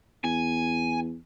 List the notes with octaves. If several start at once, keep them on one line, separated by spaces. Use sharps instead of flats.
E2 G#5